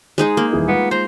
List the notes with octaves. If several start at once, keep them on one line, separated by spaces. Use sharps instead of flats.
G#3 D#4 G#4
A#3
D#1 E3 G#4
G#3 B3 F4
C5 A#5